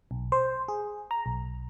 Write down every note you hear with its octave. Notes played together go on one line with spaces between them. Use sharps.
B1
C5
G#4
A#5
B1